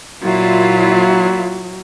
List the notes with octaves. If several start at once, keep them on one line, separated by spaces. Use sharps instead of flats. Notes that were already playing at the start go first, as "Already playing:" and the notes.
A#2 F#3 E4 F4